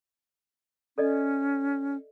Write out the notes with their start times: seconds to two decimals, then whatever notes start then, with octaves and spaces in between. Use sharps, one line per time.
0.98 C#4 A4 D5 D#5